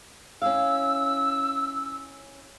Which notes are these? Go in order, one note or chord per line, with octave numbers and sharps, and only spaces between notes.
C#4 E4 F5 E6